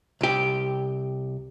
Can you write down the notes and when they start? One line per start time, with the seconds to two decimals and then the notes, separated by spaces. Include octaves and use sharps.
0.21 C2 G4